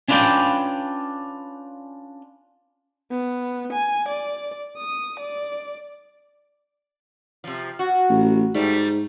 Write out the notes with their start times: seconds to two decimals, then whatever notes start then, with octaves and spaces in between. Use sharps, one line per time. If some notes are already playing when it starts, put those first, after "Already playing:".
0.08 C#4 D4 F4 B4 D5 G5
3.11 B3
3.73 G#5
4.08 D5
4.77 D#6
5.20 D5
7.44 C3 F3
7.79 F#4
8.10 A1
8.54 G#2 G3 A3